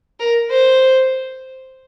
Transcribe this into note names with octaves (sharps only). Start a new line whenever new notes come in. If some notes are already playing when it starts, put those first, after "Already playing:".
A#4
C5